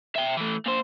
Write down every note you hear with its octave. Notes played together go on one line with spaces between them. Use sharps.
E5 G5
E3 A3
A#2 C5